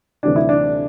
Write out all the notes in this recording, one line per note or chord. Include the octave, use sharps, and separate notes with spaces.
D2 C3 E3 G3 D4
E4
D4